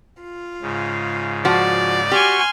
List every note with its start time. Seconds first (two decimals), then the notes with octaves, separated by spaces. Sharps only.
0.22 F4
0.62 G#2 C#3
1.45 F3 F#4 D5
2.12 F#4 G4 G#5 C6 C#6 F6